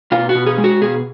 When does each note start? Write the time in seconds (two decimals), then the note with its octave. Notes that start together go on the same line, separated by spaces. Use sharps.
0.12 B2 F4
0.29 F#4
0.35 B2
0.46 G#4
0.58 G#3
0.64 F#4
0.81 B2 G#4